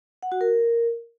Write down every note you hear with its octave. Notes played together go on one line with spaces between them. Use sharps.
F#5
F#4
A#4